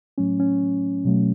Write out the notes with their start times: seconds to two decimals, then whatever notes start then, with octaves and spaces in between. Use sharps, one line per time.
0.18 A2 F#3 A3 C#4
0.40 C#4
1.05 B2 F#3 A3